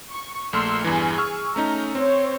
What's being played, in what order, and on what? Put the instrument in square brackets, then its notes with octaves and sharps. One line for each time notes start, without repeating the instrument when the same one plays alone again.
[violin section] C#6
[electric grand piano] A#1 A3 F6 [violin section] C6 E6
[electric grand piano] E2 G2 E3 [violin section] G#4 G#5
[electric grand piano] C#6 E6 F6
[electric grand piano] A3 C#4 D#4 [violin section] A#5
[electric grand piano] C4 [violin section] C5 C#5